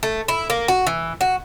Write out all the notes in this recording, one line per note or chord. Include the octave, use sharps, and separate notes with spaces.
A3
E4
A#3
F#4
E3
F#4